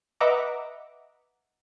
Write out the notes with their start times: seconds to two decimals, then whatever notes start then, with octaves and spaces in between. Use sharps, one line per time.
0.21 B4 D#5 E5 F#5 A#5 D6